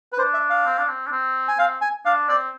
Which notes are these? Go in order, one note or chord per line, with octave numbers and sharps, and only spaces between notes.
B4
D4 C5
E5
F5
C4
D4
C4
D4
C4
G#5
C4 F5
G#5
D4 F5
C4 D5